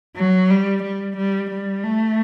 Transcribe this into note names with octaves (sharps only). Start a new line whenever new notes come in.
F#3
G3
G3
G3
G3
A3